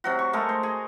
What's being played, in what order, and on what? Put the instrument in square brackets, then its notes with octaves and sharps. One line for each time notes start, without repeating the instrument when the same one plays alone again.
[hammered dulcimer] C3 F#3 F#4
C#6
G#3 A3 A#4
C5
G#4